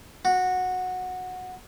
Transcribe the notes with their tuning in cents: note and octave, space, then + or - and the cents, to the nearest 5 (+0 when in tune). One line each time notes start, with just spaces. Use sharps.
F#4 -10